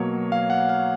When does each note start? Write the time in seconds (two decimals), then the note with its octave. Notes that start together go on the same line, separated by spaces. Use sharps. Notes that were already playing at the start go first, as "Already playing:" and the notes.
Already playing: B2 F#3 A#3 C#5
0.32 F5
0.50 F#5
0.69 F5